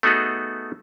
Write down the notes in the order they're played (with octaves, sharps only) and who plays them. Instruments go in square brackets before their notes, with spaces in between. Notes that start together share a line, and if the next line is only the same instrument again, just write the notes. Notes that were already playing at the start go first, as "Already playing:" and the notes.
[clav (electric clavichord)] A3 B3 D#4 F#4 G#4 A4